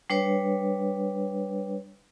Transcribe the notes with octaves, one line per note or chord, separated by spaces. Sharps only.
G3 D4 B4 C#5